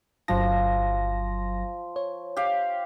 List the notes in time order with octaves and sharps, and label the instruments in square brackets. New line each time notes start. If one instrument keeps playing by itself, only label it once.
[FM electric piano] G1 F#3 A#6 [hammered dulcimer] F3
[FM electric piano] C#5
[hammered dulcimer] G4 F5